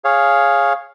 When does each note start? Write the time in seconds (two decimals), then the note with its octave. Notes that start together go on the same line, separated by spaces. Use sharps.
0.04 G#4 C#5 F5